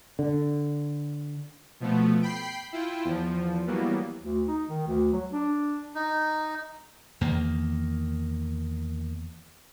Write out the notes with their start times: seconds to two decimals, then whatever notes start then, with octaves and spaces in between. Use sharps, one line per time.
0.19 D3
1.80 B2 F3 A3 B3
2.22 G5 B5 C7
2.72 E4 F4 G5
3.05 E2 F3
3.67 E3 F#3 G3 A#3 B3
4.23 D2
4.48 D#4
4.69 D#3
4.87 D2
5.13 F#3
5.32 D4
5.95 D#4
7.21 E2 D#3 A#3